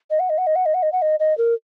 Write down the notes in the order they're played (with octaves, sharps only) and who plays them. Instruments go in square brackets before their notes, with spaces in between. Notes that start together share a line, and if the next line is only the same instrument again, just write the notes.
[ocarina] D#5
F#5
D#5
F#5
D#5
F#5
D#5
F#5
D#5
F#5
D#5
D#5
A#4